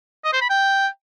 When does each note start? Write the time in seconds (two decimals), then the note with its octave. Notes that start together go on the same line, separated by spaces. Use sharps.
0.24 D#5
0.33 C5
0.41 B5
0.50 G5